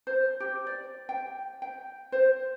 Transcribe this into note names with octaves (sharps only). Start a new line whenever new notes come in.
C5
G4
D5
G5
G5
C5